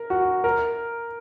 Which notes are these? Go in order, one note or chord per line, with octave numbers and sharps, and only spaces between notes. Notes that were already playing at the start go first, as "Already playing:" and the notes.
Already playing: A#4
F#4
A#4